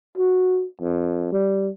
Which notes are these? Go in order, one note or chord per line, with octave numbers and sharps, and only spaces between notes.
F#4
F2
G3